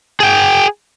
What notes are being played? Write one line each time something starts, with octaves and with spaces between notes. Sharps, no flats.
G#4 G5